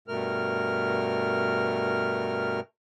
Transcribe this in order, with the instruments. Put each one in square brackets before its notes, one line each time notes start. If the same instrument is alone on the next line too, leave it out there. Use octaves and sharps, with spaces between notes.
[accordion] G2 B2 A3 A#4 F6